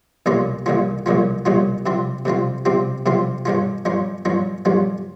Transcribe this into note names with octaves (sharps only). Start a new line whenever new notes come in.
C2 A#2 G3 C#4 F4
C2 A#2 G3 C#4 F4
C2 A#2 G3 C#4 F4
C2 A#2 G3 C#4 F4
C3 G3 C4 F4
C3 G3 C4 F4
C3 G3 C4 F4
C3 G3 C4 F4
G2 G3 C#4 F4
G2 G3 C#4 F4
G2 G3 C#4 F4
G2 G3 C#4 F4